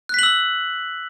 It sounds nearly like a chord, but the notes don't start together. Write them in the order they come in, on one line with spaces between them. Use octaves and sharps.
F#6 B6 F#7 E6